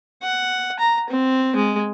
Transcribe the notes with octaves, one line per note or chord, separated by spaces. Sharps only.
F#5
A#5
C4
G#3